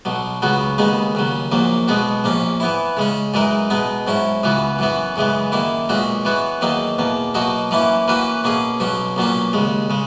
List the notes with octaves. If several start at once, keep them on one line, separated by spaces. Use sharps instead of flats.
B1 B2 F#3
C#2 C#3 F#3 B3 F#4
D#2 C#3 G#3 B3 D#4
D#2 C#3 F#3
A#1 A#2 F#3 A#3
B1 B2 G#3 B3 F#4
A#1 A#2 A#3 C#4
E3 B3 E4
C#3 G#3 C#4
F#2 E3 G#3 D#4 A#4
B2 G#3 B3 D#4
G#2 F#3 C#4 E4
C#2 C#3 E3 B3 F#4
F#2 E3 B3 F#4
F#2 C#3 E3 G#3 B3
F#2 D#3 A#3 E4
B1 A#2 G#3 C#4 F#4
E3 B3 F#4 C#5
E2 D#3 F#3 A#3 D#4
E2 B2 A#3
B2 F#3 A#3 D#4 F#4
F#2 E3 A#3 C#4 E4
E3 A#3 C#4 F#4 B4
B2 A#3 C#4 G#4
B1 B2 F#3 C#4
B1 A#2 F#3 A#3 C#4
D#2 C#3 G#3
C#3 G#3